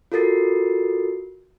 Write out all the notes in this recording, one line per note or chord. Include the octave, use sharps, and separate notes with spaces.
F4 F#4 A4 A#4 A6 C7